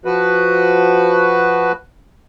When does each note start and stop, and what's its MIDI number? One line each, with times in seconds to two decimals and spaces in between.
0.05 1.72 53
0.05 1.72 66
0.05 1.72 71